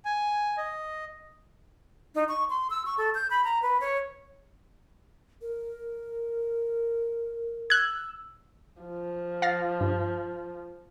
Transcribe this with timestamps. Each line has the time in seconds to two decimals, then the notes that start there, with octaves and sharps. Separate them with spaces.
0.05 G#5
0.57 D#5
2.15 D#4
2.29 C#6
2.50 C6
2.70 E6
2.86 C#6
2.98 A4
3.15 G6
3.30 B5
3.44 A#5
3.62 B4
3.81 C#5
5.41 A#4
7.70 E6 F#6 G#6
8.82 F3
9.42 F5 A6 A#6
9.81 G2